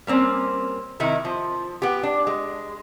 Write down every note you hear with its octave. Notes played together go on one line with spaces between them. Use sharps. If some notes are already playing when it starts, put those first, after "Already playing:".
G3 A#3 C4 C#4
C3 D#3 D#4 E4
F3
B3 G4
D4
G#3